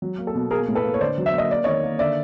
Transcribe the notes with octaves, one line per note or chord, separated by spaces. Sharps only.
F#3
A#3
A4
B2
A#3 G#4 A#4
A2
A4 B4
A#3
C#5
D3 C5 D5
F#3
E5
A#3
D#5
A#3 D5
D#3 C#5 D#5
A#3
D3 D5 E5